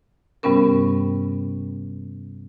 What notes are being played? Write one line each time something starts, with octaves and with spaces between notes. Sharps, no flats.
G2 C3 G3 B3 C#4 A#4